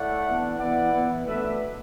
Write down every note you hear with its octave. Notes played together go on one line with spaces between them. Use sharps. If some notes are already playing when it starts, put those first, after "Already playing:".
Already playing: A2 A3 E4 D5 F#5
E3 B3 D4
E3 B3 E4 D5 F#5
E3 B3 E4
B2 A3 D4 B4 E5